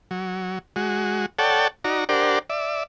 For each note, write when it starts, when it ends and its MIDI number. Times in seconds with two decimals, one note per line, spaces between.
0.11 0.59 54
0.76 1.26 56
0.76 1.26 66
1.39 1.68 69
1.39 1.68 73
1.39 1.68 74
1.39 1.68 78
1.39 1.68 79
1.39 1.68 81
1.84 2.04 63
1.84 2.04 66
1.84 2.04 74
1.84 2.04 82
2.09 2.39 62
2.09 2.39 67
2.09 2.39 70
2.09 2.39 72
2.09 2.39 74
2.09 2.39 78
2.50 2.83 74
2.50 2.83 76